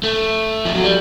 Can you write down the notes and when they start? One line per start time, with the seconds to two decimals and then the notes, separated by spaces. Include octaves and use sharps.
0.03 A3
0.65 F3
0.75 F#3
0.84 G3